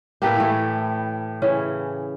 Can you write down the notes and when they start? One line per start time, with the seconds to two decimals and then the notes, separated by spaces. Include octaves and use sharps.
0.22 A2 A#3 G4 B4 E5
0.37 E3 A3
1.42 C#3 E3 C#4